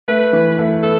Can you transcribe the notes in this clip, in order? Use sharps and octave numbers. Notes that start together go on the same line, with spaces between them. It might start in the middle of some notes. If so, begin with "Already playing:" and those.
A3 B4
E3
A3
B3 A4